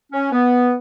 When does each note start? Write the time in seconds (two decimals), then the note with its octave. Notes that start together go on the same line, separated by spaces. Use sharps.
0.12 C#4
0.32 B3